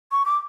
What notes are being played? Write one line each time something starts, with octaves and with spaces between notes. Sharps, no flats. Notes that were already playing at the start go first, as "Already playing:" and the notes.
C#6
D6